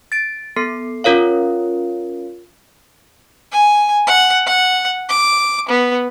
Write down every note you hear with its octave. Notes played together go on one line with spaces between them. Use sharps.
A6 D7
B3 A4 C7
C#4 F4 A#4 C#5 F5
G#5
F#5
F#5
D6
B3